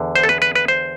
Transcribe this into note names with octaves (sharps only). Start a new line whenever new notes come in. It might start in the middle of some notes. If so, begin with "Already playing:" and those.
Already playing: E2 D3
C5
A4
B4
B4
B4
C5